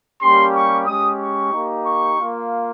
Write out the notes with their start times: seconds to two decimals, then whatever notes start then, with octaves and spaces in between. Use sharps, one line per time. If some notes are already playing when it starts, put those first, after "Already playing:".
0.22 G3 A#3 C#4 G4 C6
0.54 C#6
0.86 G#3 C#4 G4 D#6
1.20 C#6
1.53 A#3 D#4 G4
1.85 C#6
2.18 A#3 F4